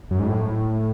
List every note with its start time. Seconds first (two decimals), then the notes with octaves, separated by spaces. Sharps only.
0.11 F#2
0.19 G#2
0.27 A2